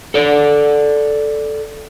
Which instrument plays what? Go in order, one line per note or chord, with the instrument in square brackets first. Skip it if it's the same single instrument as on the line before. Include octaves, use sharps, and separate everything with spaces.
[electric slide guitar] A4 D5